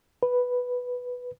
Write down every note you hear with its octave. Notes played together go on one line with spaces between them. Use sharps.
B4